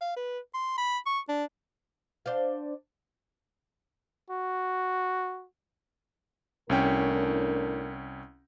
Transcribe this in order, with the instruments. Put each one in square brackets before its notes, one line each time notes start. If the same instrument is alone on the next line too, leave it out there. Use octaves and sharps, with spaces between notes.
[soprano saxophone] F5
B4
C6
B5
C#6
D4
[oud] D4 C5 F5
[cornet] F#4
[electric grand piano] C2 C#4 G5 [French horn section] A2 D4 A#4